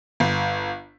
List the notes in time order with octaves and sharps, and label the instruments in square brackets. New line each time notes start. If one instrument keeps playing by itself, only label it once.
[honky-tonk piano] G1